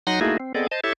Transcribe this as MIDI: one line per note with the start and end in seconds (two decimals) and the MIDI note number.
0.07 0.20 54
0.07 0.20 63
0.07 0.20 78
0.07 0.20 84
0.07 0.20 94
0.21 0.37 57
0.21 0.37 58
0.21 0.37 63
0.21 0.37 64
0.21 0.37 66
0.21 0.37 68
0.40 0.52 60
0.55 0.67 59
0.55 0.67 60
0.55 0.67 68
0.55 0.67 69
0.55 0.67 74
0.55 0.67 75
0.71 0.80 72
0.71 0.80 75
0.71 0.80 81
0.84 0.93 64
0.84 0.93 67
0.84 0.93 69
0.84 0.93 73
0.84 0.93 76